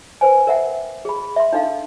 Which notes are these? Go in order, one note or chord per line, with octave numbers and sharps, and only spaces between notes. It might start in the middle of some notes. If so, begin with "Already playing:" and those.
B4 C5 G#5
A#4 E5 F#5 G5
G#4 B5
E5 C6
D4 D#4 A4 F5